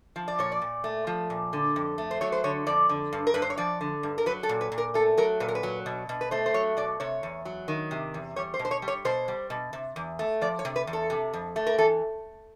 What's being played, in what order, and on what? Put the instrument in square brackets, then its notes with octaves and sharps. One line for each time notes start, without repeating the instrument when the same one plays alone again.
[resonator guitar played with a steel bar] F3
D5
A#2 C#5
D5
A#2
A3
F3
A#2
D3
F2
A3
C5
F#3 C#5
C5
D3 C#5
F2 D5
D3
G2
A#4
G2 B4
C5
C#5
F3 D5
D3
G2
A#4
F#3 B4
A4
A#2
B4
A#2
A#4
A3 A4
F#3 A#4
A#2 B4
A#4
B4
F#3
B2
B2
B4
A3 C5
C5
F#3 C#5
B2 D5
C3 C#5
E2
F#3
D#3
C3
E2
G3 C#5
C5
B2
C5
C#5
G3
C#5
B2 C5
G3
B2
C3
E2
A3
F3 D5
C#5
C3
B4
E2
A4
C3
F2
A3
A#4
E3 A4